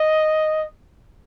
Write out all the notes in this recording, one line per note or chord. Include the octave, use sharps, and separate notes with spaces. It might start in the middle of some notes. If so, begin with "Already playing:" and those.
Already playing: D#5